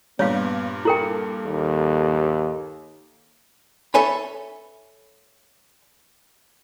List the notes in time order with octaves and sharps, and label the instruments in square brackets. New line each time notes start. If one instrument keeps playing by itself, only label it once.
[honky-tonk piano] G2 A#2 [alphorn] B3 [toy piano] C#5 F5
[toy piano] E4 A#4 G5 [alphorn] A4
[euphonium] D#2 [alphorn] A4
[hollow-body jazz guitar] A4 C#5 E5 G#5 B5